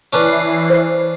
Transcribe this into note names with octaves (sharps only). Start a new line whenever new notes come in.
E3 C#4 D4 B4 C7
C5